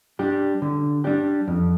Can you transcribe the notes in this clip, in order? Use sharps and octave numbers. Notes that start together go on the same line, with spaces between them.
G3 D4 G4
D3
G3 D4 G4
F2